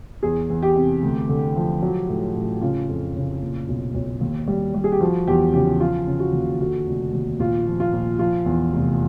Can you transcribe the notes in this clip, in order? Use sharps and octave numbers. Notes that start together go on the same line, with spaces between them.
E2 G#4
E2
G4
C3
D2
D3
F3
F#3
A2
A1
C#3 F4
F2
C#3
A#2
B1
B1
D#2
G3
G3
G#4
G4
F3 F#4
E2 G4
C#3 G4
F3 F4
C#3
F#4
D#2
D3 F#4
F1
D#2
A#1 F4
F3
F4
A#1
F3 F4
E2
F1